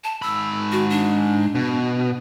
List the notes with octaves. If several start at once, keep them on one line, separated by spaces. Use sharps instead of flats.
A5
G#2 B5 E6
F#4
D4
B2